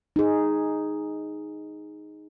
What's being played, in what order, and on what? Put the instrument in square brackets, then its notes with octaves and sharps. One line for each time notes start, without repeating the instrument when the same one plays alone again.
[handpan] D#4 G#4